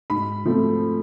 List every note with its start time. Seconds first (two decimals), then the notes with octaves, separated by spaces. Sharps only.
0.10 G#2 B5
0.45 F3 A3 C4